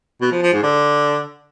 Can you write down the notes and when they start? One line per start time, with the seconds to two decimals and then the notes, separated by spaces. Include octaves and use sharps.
0.21 B2
0.32 F3
0.42 F3
0.53 G#2
0.63 D3